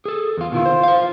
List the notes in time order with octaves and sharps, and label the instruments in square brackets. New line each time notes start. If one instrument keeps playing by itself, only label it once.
[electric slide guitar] G#4 A4
E2 F4
[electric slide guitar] B2 D#3 E4 [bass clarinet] F4
[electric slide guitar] C5
C5 F5